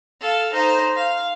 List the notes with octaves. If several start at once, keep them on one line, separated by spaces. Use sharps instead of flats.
A4 F5
D#4 C5
F5